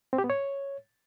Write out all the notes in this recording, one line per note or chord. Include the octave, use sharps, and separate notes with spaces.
C4
G4
B3
C#5